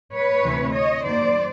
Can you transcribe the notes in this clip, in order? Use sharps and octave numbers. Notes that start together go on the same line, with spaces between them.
B4 C#5
D2 C3 E3 A3 C4
C#5 D#5
F#2 D#3 F#3 A#3 C5 D5